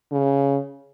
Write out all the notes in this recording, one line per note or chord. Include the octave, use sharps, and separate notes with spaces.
C#3